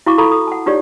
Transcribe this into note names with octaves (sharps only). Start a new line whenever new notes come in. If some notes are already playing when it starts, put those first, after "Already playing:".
E4 F#4 F5 C#6 D6
F4 A4 F5 A#5 B5 C#6
D#6
F#5 A5
D#4 F4 G4 C#5 D5